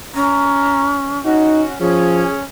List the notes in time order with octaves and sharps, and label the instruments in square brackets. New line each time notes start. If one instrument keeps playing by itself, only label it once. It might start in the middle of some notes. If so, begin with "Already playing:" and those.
[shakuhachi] C#4 [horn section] A#5
[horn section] C#4 F#4 [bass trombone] D#4
[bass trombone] F3 [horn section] C#4 [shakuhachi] G#4